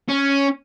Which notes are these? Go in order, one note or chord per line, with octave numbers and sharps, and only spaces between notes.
C#4